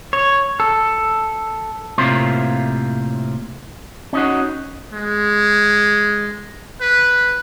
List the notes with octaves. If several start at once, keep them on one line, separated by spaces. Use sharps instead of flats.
C#5
A4
A2 C3 A#3 F4 C5 C6
C#4 D#4 F#4
G#3
B4